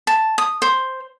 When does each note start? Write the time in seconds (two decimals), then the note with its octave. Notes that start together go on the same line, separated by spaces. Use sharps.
0.07 A5
0.38 D#6
0.62 C5